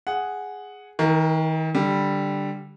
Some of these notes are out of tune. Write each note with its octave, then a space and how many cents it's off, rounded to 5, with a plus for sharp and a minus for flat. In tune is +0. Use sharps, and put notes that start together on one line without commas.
G#4 +0 F#5 +0
D#3 +40 A#4 -10
D3 +0 G3 +0